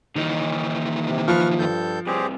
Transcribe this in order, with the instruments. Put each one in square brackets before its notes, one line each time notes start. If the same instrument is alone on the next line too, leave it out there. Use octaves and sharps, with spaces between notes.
[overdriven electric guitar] A#2 D#4 [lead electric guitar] D#3 E3
[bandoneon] C3
[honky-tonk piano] F3 [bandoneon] B4 C#6 F6
[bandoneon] G2 A4 G6
[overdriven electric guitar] G2 C3 [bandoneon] C4 G4 G#4